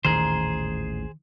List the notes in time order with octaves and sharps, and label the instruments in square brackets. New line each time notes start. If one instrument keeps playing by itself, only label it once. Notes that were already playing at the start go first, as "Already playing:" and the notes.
[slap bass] A1 D#2 A#2 [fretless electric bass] D#3 [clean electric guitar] G#4 C5 [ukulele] A#5